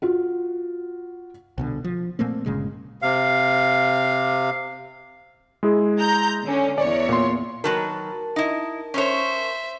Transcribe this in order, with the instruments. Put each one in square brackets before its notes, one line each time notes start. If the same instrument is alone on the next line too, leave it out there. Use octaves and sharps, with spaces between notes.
[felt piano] F4 F#4
[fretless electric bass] C2 B2 D3
F3
A#2 A3 A#3 C4
G1 A#2 C#3 G#3
[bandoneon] C3 F5
[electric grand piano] G#3 E4 G#4
[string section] A#5 G6
D3 C#4
[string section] E2 C#5 [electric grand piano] D5
[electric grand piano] A#2 C6
[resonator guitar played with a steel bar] D#3 F#3 B4 [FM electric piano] A#4 A5
[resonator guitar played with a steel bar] D#4 E4
[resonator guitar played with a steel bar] C#4 C#5 [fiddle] C5 E5